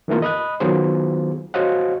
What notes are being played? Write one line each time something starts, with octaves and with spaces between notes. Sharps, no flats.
D#3 E3 A3 A#3 F4
D#5 B5 D#6 F#6
D#3 F#3 B3 F4 G#4 C5
F#4 C5 C#5 D#5 F5 F#5